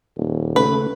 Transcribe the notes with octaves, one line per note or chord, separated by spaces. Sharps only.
D#1
C#3 A3 B4